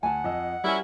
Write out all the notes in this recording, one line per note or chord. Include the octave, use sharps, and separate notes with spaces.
D2 F#5 G#5 A5
F2 D#5 E6
F#3 G3 C#4 E4 A#4 G#5